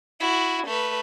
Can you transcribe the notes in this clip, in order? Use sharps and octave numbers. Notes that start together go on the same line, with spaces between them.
E4 F#4
A3 B4